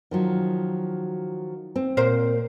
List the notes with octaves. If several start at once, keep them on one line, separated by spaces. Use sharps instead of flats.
D#3 F3 F#3
C4
A#2 A#4 C5